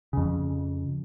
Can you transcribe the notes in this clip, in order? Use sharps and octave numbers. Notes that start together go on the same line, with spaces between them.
F2 C#3